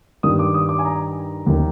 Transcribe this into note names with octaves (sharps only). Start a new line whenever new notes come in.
G2 D#3 D#6
D6
D#6
D6
G#5
A#5
D#2 D#3